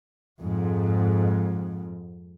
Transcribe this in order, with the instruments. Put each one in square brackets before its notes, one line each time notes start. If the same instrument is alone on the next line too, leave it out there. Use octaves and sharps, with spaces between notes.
[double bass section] F2 G#2